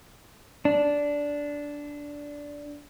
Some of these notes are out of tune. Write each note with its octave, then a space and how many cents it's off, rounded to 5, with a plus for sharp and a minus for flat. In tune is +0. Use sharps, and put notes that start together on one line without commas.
D4 -10